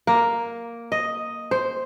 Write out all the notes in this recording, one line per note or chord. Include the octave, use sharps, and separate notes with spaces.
A#3
D#5
C5